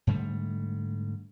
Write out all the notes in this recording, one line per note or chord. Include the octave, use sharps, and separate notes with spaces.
G#2 D3 G3 A3